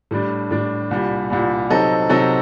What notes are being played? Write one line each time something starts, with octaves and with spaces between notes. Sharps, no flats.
A2 G3 D4
A2 G3 D4
C2 A#2 G3
C2 A#2 G3
C3 F#3 C4 D#4 A4
C3 F#3 C4 D#4 A4